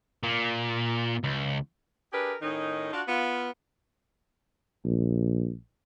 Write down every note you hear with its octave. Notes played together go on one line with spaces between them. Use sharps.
A#2
C#2
D4 G4 G#4 A#4 B4
A2 D#3 C#4 D#4
D4 F4 F#4
B3 F4
A#1